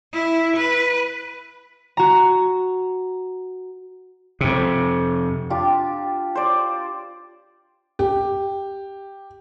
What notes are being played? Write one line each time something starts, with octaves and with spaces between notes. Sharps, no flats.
E4
B4
F#4 A#5
F2 C3
D4 F4 G4
C5 D5
G4